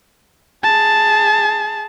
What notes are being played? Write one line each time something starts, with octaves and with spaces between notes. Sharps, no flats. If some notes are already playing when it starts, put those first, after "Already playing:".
G#4 A5